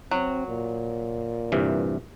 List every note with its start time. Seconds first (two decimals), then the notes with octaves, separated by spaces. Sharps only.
0.11 F#3 C4
0.48 A#2
1.52 G2 C3 E3